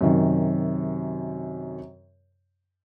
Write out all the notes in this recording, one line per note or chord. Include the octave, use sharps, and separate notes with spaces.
F#2 C3 D#3